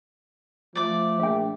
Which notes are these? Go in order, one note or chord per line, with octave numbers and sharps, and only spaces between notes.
F3 A3 D5 D6
A#1 E5 G5